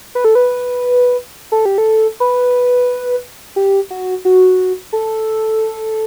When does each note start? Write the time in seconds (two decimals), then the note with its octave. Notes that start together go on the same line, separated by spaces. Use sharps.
0.15 B4
0.25 A4
0.35 B4
1.52 A4
1.65 G4
1.78 A4
2.20 B4
3.56 G4
3.90 F#4
4.25 F#4
4.93 A4